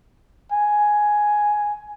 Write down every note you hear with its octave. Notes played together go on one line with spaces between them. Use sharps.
G#5